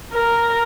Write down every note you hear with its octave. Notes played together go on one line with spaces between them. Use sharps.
A#4